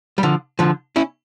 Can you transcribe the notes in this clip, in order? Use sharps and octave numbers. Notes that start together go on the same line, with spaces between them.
G3
D3 F3
D3 F3
C#4 E4